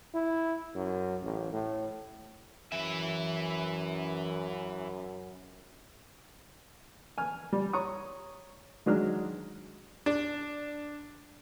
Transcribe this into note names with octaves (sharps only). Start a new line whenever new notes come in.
E4
F#2
A1
A2
F#2 E3 E5
G#5 F6
G3
C#5 A#5 C#6 D#6
D#3 F#3 G#3 D4 F6
D4